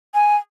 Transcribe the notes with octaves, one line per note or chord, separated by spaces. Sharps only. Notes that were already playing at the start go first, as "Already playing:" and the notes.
G#5